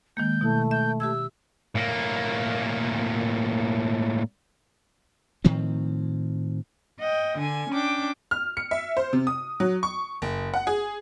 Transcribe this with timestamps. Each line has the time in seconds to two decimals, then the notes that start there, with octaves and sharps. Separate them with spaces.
0.17 D#3 G#3 A#3 G6
0.41 B2 A3 E4
0.71 E5 G6
1.00 G4 E5 E6 G#6
1.75 A2 A#3
5.44 A2 D#3 F3 C4
6.99 D#5 F#5 G5
7.38 D3 G#5
7.70 C#4 D4 G5 D6
8.31 F6
8.57 C#7
8.71 E5
8.97 C5
9.13 C3
9.27 D#6
9.60 F#3
9.83 C#6
10.22 F#1
10.54 F#5
10.67 G#4